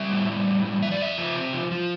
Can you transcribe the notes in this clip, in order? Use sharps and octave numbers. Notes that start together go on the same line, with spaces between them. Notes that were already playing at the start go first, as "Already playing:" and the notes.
Already playing: G3 E5
A2
G3
A2
G3
F3 E5
D5
F2 E5
F3
C3
F3
F3